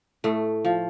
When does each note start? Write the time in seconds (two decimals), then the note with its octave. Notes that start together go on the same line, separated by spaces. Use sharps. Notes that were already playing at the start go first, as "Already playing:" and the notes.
0.24 A2 A3
0.65 F3